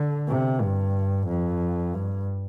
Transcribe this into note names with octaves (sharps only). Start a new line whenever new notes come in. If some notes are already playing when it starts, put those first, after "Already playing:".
Already playing: D3
C3
G2
F2
G2